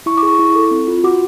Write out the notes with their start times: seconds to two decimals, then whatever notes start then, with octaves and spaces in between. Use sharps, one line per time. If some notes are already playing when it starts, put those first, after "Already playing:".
0.06 E4 C#6
0.17 D6
0.23 G#4
0.28 C#6
0.39 E4
0.55 A4
0.71 C4
0.88 F4
1.04 F#4 D6